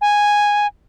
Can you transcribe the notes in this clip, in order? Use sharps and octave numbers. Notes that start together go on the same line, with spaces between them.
G#5